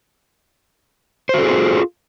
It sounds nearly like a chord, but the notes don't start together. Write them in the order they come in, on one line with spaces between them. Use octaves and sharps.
C5 F#4 A4 G#4 F4